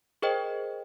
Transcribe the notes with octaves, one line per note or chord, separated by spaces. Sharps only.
G#4 A#4 C5 D#5 G5